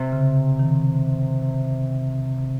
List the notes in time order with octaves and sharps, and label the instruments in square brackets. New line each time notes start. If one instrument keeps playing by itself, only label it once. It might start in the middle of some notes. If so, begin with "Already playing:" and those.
Already playing: [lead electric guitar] C3
[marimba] C#3
D#3